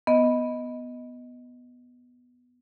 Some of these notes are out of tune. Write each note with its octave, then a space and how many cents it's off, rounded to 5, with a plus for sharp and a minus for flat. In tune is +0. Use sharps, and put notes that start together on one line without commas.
B3 +0 D#5 +10